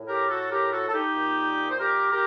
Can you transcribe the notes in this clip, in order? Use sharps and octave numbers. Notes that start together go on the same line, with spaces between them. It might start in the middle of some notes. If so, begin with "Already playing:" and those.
Already playing: A2
G4 A#4
F#4 A4
G4 A#4
F#4 A4
A4
D#4 G4
A#2
C5
G4 A#4
G4 A#4